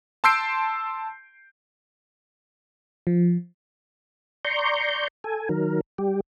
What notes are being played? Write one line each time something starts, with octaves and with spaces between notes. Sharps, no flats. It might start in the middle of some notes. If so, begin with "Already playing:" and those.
A5 C6 E6 G6 C7 D7
F3
D5 A#5 C6 C#6 G6
A4 G#5
D#3 F#3 A#4
G3 G4